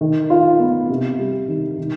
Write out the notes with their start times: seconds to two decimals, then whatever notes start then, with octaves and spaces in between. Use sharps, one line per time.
0.01 D#3
0.30 F4
0.60 B3
0.89 C3
1.19 G3
1.48 D#3
1.78 D#3